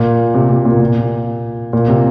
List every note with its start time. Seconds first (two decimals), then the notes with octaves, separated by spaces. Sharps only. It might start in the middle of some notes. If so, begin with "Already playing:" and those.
Already playing: A#2
0.34 C3
0.50 C3
0.65 A#2
0.80 A#2
1.73 A#2
1.88 C3